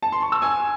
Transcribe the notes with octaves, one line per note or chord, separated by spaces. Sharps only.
A5
C6
C#6
E6
G#5